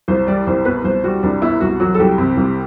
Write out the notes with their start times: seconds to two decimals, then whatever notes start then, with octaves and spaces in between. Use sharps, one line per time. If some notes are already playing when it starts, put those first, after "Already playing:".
0.08 C2 C5
0.27 G3 D5
0.47 C2 C5
0.65 B2 B4
0.84 C2 C5
1.04 G3 F#4
1.23 C2 D4
1.42 B2 E4
1.61 C2 F#4
1.80 F#3
1.94 A4
1.99 C2 G4
2.18 C3
2.37 C2